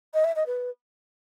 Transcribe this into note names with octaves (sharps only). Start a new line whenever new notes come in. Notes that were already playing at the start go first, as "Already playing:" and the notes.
D#5
E5
D#5
B4